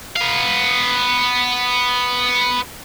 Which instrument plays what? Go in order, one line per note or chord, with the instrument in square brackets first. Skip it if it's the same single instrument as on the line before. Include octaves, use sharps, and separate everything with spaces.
[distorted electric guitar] B3 F5